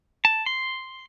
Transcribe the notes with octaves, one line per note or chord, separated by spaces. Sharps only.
A5
C6